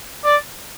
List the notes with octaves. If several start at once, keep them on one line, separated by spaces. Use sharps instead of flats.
D5